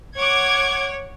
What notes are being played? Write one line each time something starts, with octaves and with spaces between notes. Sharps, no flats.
C#5 F#5 D6 G#6